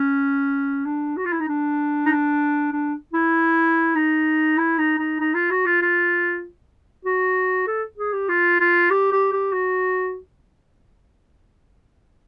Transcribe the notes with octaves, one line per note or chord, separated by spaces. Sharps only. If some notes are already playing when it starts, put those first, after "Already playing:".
Already playing: C#4
D4
F#4
F4
E4
D#4
D4
D#4
D4
D4
E4
D#4
E4
D#4
D#4
D#4
F4
F#4
F4
F4
F#4
A4
G#4
G4
F4
F4
G4
G4
G4
F#4